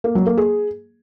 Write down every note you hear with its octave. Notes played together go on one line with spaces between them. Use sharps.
A#3
F#3
A#3
G#4